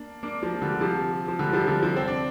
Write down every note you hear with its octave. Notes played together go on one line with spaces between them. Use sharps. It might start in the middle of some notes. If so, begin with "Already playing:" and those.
Already playing: A#3 D4
A#3 D4
F3 A#3
D3 G3
C3 F3
F3
D3 G3
C3 F3
D3
C3 F3
C4
D4